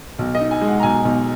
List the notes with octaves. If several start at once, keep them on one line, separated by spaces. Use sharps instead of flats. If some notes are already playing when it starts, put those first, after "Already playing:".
B1
D#5
D#4
G#5
G#3
F#5
A#5
B1 G#5
B1